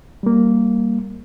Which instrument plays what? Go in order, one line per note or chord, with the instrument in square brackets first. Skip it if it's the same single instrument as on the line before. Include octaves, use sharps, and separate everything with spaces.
[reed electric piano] G3 A#3